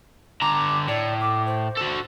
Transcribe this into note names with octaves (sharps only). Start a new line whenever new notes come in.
D3 A#5 D6
A2 D5
D6
C5
F#4 A4